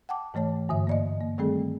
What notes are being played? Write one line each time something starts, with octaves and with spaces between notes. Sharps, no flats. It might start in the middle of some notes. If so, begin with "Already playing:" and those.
F#5 G5 A5 D6
G#2 E3 A3 C#5 A5
G2 D3 E5
A#3 D5 D#5
A#3
D#3 G3 A3 C4 G#4 A4